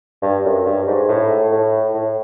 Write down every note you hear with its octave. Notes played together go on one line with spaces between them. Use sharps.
G2
F#2
G2
G#2
A2
A2
A2